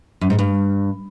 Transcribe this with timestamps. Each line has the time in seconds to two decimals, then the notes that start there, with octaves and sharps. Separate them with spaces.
0.21 F#2
0.30 G#2
0.39 G2